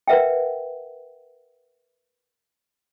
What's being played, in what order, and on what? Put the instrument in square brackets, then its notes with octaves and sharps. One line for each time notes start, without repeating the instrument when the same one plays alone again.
[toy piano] A#4 B4 E5 F#5 G5